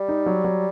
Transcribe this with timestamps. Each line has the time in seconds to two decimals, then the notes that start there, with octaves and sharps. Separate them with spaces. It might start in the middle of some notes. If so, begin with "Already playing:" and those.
Already playing: G3
0.09 D#4
0.26 F#3
0.44 F#3